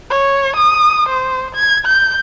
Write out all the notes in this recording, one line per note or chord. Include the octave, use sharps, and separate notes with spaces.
C#5
D#6
C5
G#6
G6